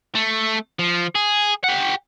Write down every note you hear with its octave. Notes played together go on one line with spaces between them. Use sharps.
A3
F3
G#4
G4 F#5